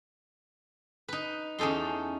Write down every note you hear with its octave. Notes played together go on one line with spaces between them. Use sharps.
D#4 B4
E2 C#4 D#4 A4 C6